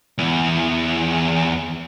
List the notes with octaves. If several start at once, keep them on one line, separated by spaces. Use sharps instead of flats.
E2 E3